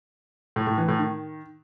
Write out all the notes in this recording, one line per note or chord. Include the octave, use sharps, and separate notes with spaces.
A2
A2
E3
A2
D#3